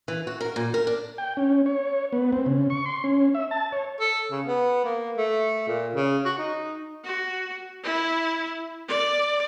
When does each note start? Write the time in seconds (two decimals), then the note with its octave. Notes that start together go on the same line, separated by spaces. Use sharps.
0.08 E3
0.27 F#4
0.41 A#4
0.56 A#2
0.74 A#4
0.87 D4
1.18 G5
1.37 C#4
1.66 C#5
2.13 B3
2.33 C4
2.46 C#3
2.70 C#6
2.86 C6
3.04 C#4
3.35 E5
3.51 A5
3.72 C#5
4.00 A4
4.31 C#3
4.47 B3
4.85 A#3
5.17 A3
5.68 A#2
5.95 C#3
6.25 F#4
6.38 D#4
7.05 F#4
7.84 E4
8.88 D5